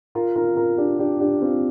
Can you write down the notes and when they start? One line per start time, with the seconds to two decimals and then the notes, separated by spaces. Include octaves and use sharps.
0.15 F4 A#4
0.36 F4 A#4
0.57 F4 A#4
0.78 D4 G4
0.99 D4 G4
1.20 D4 G4
1.42 C4 F4